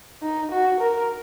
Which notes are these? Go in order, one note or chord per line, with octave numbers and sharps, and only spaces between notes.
D#4
F#4
A#4